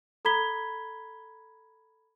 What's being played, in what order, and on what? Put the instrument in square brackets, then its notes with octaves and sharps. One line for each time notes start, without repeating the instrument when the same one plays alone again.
[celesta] A4 A#5 B5 G#6 B6 G7